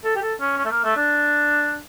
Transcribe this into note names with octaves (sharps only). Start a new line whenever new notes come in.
A4
G4
A4
C#4
C#4
A3
A#3
A3
D4